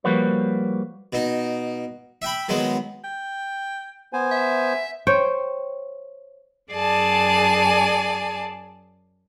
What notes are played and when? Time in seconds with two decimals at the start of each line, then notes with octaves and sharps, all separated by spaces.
0.04 F3 G3 A#3 F#4 B4 C#5
1.13 B2 D#4
2.22 E5 G5 B5
2.49 D#3 F#3 G#3 B3
3.04 G5
4.13 B3 C5 G#5
4.31 E5
5.07 C5 C#5 G5
6.71 F#2 G#4 D5 G#5 A5